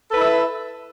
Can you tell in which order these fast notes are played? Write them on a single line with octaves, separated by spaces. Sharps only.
A4 B4 E4 E5